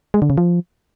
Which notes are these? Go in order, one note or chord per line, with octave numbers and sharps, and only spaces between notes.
G#3
D3
C#3
F3